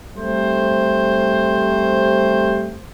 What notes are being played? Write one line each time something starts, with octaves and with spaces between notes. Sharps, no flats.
G3 A3 C4 C5